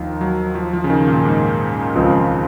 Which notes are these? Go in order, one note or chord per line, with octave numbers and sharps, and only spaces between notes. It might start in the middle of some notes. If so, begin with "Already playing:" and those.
Already playing: D#2 D#3 F3
F#3
F3
F3
C#3
D#3
A#2
G#2
C#2 C#3 F3 C4